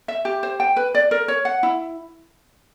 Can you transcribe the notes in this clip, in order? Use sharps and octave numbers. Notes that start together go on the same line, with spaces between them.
E5
G4
C5
G5
B4
D5
A#4
C#5
F#5
E4